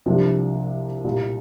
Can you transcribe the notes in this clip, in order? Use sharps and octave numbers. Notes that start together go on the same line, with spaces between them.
C2 C3 F3 A#3 D4
C2 A#2 G3